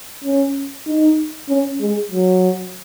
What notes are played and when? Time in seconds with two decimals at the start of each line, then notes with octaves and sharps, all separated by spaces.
0.24 C#4
0.87 D#4
1.49 C#4
1.81 G#3
2.12 F#3